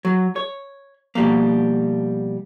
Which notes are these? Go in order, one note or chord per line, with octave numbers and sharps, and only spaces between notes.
F#3
C#5
B2 F3 G3 A3 A#3